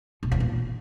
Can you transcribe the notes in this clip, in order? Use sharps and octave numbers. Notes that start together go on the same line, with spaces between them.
B2
E2
A#2